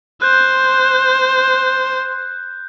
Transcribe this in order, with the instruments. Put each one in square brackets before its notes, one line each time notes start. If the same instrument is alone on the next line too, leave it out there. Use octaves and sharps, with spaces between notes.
[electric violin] C5 [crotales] F#6 G6